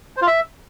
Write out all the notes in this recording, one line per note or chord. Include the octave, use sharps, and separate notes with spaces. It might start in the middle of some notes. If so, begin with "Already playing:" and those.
C5
F4
E5